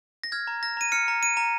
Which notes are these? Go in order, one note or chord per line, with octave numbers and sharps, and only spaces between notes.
A#6
F6 G#6
A#5
F6 A#6
A#5 D#7
F6 C#7
A#5
F6 D#7
A#5